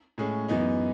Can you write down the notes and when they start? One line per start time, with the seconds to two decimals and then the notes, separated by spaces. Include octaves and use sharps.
0.18 A2 G#3 C#4 G#4
0.48 F#2 E3 B3 D#4